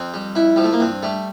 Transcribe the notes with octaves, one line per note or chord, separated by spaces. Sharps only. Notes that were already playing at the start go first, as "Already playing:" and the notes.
Already playing: F2 C4
G3
F2 E4
F3 G3
A3
A#3
G2 C4
G3 A3